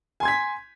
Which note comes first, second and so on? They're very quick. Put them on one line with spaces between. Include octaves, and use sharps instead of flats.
G#5 C6 G#6 B6